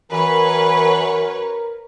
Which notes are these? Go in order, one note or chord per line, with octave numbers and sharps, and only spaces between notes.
F#2 E3 A#4 B4 C#5